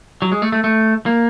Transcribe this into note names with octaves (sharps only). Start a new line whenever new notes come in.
F#3
G#3
A3
A3
A3
A#3